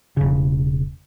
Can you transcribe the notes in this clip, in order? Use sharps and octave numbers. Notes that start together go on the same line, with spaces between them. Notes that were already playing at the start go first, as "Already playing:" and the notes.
E1 C#3